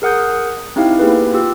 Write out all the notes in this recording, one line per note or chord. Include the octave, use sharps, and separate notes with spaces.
G#4 A#4 F#5 D#6 G6
C4 D#4 E4 G4 F5
A#3 B3 G4 G#4 B4
F4 G4 E6